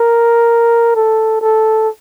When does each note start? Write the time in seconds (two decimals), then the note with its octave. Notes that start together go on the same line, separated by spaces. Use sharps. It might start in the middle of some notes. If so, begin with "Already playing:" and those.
Already playing: A#4
0.96 A4
1.41 A4